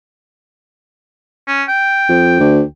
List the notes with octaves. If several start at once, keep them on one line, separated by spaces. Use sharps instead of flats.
C#4
G5
F2
D2